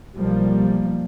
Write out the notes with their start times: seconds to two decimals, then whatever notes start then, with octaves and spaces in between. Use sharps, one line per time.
0.17 B1 F3 G3 A#3